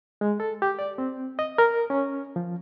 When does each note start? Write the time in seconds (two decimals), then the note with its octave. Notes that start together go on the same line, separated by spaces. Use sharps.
0.21 G#3
0.40 A4
0.62 G4
0.79 D5
0.98 C4
1.39 D#5
1.58 A#4
1.90 C#4
2.36 F3